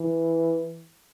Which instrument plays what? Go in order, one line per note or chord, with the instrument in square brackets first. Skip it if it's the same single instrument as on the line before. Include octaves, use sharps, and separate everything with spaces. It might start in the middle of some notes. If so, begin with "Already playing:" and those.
Already playing: [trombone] E3